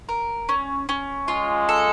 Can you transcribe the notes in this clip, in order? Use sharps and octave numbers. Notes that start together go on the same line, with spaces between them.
A#4
C#4
C#4
G#3 F4
A4